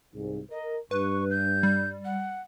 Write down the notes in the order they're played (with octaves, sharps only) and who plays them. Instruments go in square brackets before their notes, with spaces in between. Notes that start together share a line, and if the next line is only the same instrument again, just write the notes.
[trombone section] C2 G#2
[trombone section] A#4 [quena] D#5
[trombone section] G2 [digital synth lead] B4 [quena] C#6
[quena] G6
[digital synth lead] G3
[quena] F#5